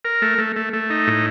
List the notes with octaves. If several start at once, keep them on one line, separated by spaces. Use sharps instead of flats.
A#4
A3
A3
A3
A3
D#4
A2